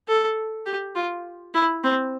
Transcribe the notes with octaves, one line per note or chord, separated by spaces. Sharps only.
A4
G4
F4
E4
C4